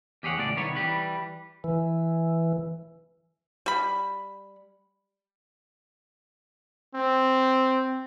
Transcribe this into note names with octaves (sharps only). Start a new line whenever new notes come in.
E2 G4 G#4 C#5 F#5
C#2 A2 F#4 D5
C2 D#3 B3 C#5
E3 G3 G4 B4
E3
G3 B5
C4